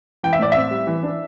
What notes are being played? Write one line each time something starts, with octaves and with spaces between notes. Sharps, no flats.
E3 G5
E5
A2 D5
C4 E5
G3
E3
D4